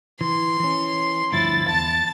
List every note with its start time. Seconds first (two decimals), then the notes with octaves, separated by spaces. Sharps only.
0.21 E3 C6
0.60 E3 C#4
1.32 D2 G2 F3 E4 A6
1.68 E2 A5